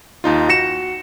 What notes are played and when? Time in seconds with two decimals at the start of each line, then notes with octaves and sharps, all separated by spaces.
0.24 D#2 D#4 F4
0.49 F#4 A#6 C#7 E7